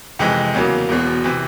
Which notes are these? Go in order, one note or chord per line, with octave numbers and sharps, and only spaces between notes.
F2 C3 E3 G#3
E2 C#3 F#3 A#3
E1 E2 B2
C3 E3